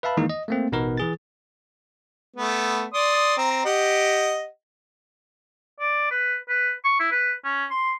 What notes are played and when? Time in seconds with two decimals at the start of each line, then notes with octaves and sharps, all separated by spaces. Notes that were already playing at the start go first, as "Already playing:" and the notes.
0.03 B4 E5 F5 A5 B5
0.17 D#3 E3 G#3 A#3 D#4
0.30 D#5
0.48 A3 A#3 C4
0.72 A1 B2 B3 D#4 A#4 B4
0.98 E3 G#4 A6
2.36 A3 B3
2.94 D5 C6 D#6
3.37 C4 A#5
3.65 G4 D#5 F#5
5.80 D5
6.11 B4
6.49 B4
6.84 C#6
6.99 E4
7.11 B4
7.45 C#4
7.70 C6